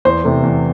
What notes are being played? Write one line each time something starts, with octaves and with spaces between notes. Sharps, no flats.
E2 C5
C3 E3 A3
E2